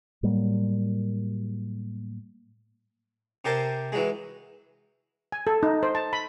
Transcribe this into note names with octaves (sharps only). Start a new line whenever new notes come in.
A2 F#3 G3 A#3
C3 G4 A#4 C5 G#5 A5
E3 F#3 G#3
G#5
A4
D#4
C5
A5
B5